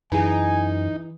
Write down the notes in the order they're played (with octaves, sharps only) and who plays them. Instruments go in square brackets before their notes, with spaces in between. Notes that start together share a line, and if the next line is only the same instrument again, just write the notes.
[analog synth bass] F#2 [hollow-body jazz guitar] E3 G#4 [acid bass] D#4 [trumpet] G#5